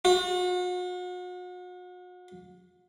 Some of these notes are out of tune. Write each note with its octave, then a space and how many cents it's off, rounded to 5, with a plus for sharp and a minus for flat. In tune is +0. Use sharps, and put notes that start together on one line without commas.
F#4 -40